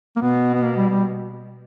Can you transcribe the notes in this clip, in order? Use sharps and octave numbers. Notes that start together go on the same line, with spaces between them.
A#3
B2 B3
B3
A#3
G3
G3